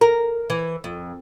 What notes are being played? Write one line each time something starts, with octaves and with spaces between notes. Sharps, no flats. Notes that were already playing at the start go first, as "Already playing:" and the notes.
A#4
E3
F2